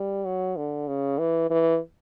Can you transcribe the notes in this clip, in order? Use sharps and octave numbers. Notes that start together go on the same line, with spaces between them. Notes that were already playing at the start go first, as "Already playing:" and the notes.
Already playing: G3
F#3
D3
C#3
E3
E3